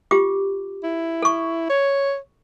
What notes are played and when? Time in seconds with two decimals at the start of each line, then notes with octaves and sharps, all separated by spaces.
0.11 F4 G4 D6
0.83 E4
1.22 A4 C#6
1.70 C#5